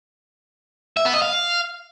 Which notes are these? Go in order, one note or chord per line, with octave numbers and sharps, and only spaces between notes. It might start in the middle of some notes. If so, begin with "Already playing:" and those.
E5
B3
D#5
F5